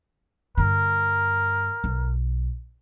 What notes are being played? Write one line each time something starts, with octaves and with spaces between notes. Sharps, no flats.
G2 D3 A#4
B1